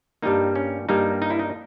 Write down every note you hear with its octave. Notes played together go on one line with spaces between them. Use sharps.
G2 G3 A#3 D#4
C#4
G2 G3 A#3 D#4
D#4
E4
D#4